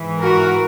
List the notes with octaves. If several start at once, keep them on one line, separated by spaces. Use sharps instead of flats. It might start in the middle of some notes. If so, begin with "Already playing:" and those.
Already playing: G#2 E3
F#4 A#4